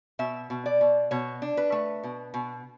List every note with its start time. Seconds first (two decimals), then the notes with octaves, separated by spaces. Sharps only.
0.19 B2 E5
0.50 B2
0.66 D5
0.81 B2
1.11 B2 C#5
1.42 D4
1.57 B4
1.72 A3
2.04 B2
2.34 B2